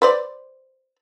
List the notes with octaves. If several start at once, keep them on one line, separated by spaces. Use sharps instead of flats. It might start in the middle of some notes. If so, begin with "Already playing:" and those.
B4 C5 D5